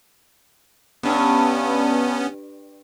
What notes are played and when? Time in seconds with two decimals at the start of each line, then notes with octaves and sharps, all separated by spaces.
1.03 G2 B3 C#4